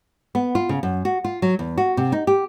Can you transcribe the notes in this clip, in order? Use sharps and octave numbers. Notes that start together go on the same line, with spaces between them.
B3
F4
C#3
F#2
F#4
F4
F#3
E2
F#4
C3
D#4
G4